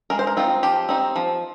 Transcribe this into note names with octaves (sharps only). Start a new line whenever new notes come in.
G#3 A#4
C5
A#4
C4 D#4 F4
F3 G4
C4 D#4
F3